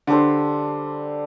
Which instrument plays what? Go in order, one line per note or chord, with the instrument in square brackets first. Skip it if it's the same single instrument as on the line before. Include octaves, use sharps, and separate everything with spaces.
[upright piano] D3 [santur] G3 D4 A4 C5